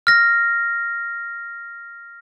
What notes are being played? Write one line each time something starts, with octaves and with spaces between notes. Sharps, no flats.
F6 A#6